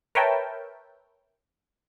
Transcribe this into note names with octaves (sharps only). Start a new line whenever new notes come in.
A#4 B4 C#5 E5 G5 A5